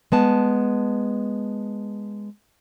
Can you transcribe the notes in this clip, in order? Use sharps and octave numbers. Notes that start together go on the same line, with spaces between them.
G#3 B3 A5